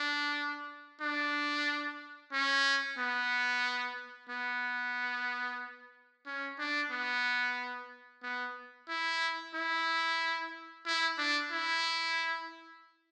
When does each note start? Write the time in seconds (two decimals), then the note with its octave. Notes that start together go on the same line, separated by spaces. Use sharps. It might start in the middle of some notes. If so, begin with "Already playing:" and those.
Already playing: D4
1.01 D4
2.33 C#4
2.98 B3
4.30 B3
6.26 C#4
6.59 D4
6.91 B3
8.23 B3
8.89 E4
9.55 E4
10.86 E4
11.18 D4
11.52 E4